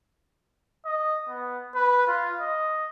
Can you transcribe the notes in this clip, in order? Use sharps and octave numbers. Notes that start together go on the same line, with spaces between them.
D#5
B3
B4
F4
D#5